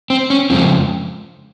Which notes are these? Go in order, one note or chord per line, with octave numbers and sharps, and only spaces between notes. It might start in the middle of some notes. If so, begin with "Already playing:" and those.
C4
C#4
F2 C#3 G#3 C4